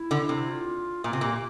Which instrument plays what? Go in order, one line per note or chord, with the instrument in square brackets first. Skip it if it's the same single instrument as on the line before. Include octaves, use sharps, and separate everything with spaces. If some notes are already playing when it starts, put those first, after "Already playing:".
Already playing: [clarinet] E4
[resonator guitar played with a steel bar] D3
C3
[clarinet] F4
[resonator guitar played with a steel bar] A#2 [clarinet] F4
[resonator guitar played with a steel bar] C3
[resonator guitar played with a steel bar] A#2 [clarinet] G4